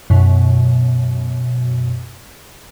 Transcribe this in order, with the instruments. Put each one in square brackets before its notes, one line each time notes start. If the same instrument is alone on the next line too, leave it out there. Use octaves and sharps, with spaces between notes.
[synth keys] F#2 B2